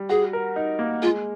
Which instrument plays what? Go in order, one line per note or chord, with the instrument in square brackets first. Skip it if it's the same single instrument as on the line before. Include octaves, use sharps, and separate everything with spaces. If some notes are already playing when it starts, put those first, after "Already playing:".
Already playing: [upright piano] G3
[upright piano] F#4 [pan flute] G#4
[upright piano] A#4
D#4
A#3
[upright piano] G#3 [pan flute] F4